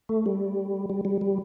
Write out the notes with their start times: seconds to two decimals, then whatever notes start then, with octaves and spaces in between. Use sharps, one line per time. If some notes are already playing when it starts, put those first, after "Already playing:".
0.09 A3
0.26 G3
0.90 G3
1.05 G3
1.21 G3